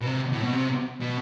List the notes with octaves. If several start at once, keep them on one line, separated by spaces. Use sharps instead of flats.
B2
C3
A2
B2
C3
B2